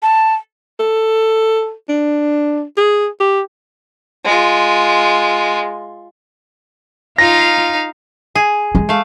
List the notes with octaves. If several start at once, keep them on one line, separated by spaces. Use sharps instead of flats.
A5
A4
D4
G#4
G4
G#3 F4
D#4 F4 F5 A#6
G#4
G#3
A3 F5